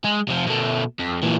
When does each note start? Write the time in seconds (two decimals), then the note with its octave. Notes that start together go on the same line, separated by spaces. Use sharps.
0.05 G#3
0.28 C3 F3
0.47 B2 A3
0.99 F2
1.23 A#2 E3